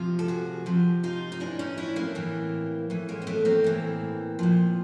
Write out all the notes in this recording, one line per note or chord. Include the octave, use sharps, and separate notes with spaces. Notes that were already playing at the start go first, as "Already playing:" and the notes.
Already playing: C3 F3 F4
A4
F#4 G#4
C3 F3
D#4 F4
D#4
A2 E3 D4 E4
C#4 D#4
D4 E4
A#3 C4
A2 E3
A2 E3
G#3 A#3
C4
A3 B3
A#3 C4
A2 E3
A#2 F3